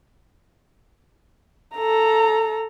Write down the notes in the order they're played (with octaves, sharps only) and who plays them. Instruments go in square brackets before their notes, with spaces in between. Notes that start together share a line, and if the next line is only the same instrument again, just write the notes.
[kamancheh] A4 A#5